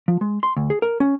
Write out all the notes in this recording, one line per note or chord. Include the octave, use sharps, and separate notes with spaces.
F3
G#3
C6
D2
G#4
A#4
C#4